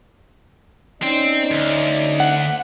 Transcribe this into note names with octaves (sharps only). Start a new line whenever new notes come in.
C4 C#4 D#4 D5
D2
F#5